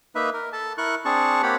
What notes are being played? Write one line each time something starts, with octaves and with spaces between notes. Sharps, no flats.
A#3 D#4 B4 E5
A#4
A4 A5
E4 A#4 C#6 F#6
C4 D4 G#4 A5 C#6
A#3 C4 G4 C#5 F#5 B5